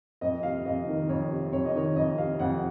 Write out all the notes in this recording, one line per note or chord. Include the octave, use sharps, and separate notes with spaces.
F2 D#5
C3 F5
F2 D#5
D#3
F2 C#5
C3
F2 C#5
D#5
D#3 C#5
F2 D#5
C3 F5
F2 F#5